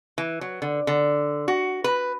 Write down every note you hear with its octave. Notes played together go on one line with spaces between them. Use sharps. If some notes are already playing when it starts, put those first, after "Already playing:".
E3
F#3
D3
D3
F#4
B4